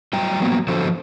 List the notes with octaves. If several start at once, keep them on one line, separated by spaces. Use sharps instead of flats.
F#3 G3 G5 A#5
F#3 G3 A#3 B3
D3 F3 F#4 A4 C5